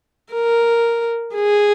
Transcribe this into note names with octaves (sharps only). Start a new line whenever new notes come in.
A#4
G#4